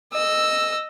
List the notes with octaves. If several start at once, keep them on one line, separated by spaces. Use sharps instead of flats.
D#5 E6